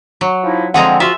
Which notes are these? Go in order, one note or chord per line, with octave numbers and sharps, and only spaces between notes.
F#3
F3 D#4 E4
D3 F3 G#3 C4 G#4 F#5 A#5
F4 F#4 E5